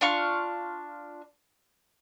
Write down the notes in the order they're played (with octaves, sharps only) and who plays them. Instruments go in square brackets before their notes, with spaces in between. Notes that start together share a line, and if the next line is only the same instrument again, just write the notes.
[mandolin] D4 F4 F5 C#6